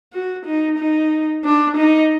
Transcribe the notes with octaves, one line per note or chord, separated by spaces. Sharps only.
F#4
D#4
D#4
D4
D#4